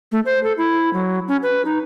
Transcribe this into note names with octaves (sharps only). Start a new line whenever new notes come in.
A3
C5
A4
E4
F#3
C#4
B4
D#4